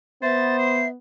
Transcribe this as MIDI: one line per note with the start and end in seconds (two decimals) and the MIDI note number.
0.22 0.96 59
0.22 0.83 72
0.22 0.88 76
0.22 0.57 93
0.59 0.86 96